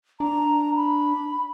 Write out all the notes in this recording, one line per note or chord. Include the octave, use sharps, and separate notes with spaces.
D4 A#5
B5